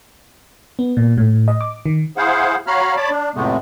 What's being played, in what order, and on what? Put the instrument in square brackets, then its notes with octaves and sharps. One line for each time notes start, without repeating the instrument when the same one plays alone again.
[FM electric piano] B3
A#2
A2
D#5
D6
D#3
[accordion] E4 G#4 C5 F5 F#5
F#4 C#5 F5 A#5 B5 F6
C#5 D5 A5 B5 D6
D4
F2 A2 C3 G#3 A3 B3